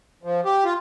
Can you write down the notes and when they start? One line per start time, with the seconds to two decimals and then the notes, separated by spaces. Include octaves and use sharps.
0.23 F3
0.45 G4
0.65 F4